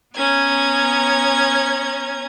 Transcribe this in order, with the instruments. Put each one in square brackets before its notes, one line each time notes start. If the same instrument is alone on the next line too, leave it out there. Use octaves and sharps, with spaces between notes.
[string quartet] B3 C#4 A#5 G#6